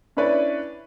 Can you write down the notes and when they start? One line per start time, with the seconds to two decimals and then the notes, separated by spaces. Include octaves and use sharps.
0.17 C#4 D4 E4 B4 C#5 D5